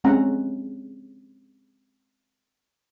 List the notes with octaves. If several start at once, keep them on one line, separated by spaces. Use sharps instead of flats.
G#3 C4 C#4 F#5 A#5